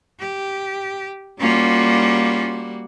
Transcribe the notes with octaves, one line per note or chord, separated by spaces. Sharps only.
G4
G3 A#3 C#4 F4 F#4